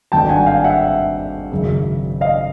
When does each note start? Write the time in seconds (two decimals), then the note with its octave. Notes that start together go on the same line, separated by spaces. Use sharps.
0.12 G#1 G2 D3 G5 A5
0.29 F#5 G#5
0.46 F5 G5
0.64 E5 F#5
0.81 E5
1.51 G#1 F#2 C#3
2.21 D#5 F5